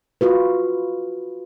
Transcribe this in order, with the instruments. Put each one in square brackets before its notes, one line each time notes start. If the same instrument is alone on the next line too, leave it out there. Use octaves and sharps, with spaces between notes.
[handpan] F4 F#4 B4